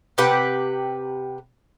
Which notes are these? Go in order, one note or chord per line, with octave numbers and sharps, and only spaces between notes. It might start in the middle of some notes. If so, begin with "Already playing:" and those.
C3 G4 B4 F#5